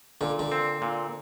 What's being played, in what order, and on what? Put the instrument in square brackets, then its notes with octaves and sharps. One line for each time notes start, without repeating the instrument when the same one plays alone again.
[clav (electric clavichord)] A#2 [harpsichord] D3
[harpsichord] D3
[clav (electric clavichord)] C4
A#2